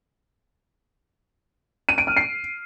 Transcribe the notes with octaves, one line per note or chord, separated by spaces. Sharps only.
D#7
D7
F6
C7